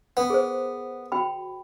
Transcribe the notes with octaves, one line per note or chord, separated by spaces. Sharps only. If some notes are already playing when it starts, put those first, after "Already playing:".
B3
G#4 A#4 C5
F#4 G5 B5